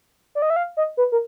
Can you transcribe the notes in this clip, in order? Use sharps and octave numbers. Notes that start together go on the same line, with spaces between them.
D5
D#5
E5
F5
D#5
B4
A#4